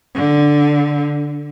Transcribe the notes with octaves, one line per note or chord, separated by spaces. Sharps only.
D3